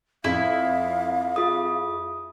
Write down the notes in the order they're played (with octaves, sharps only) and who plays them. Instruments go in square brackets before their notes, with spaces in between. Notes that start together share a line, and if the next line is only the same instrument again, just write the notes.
[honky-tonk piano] F2 [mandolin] E4 [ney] F5
[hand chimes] F4 G#4 D#6